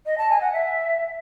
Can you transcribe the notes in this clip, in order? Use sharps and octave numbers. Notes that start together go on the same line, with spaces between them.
D#5
A5
G#5
F#5
E5